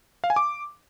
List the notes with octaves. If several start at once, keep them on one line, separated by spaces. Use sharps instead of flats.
F5
G#5
D6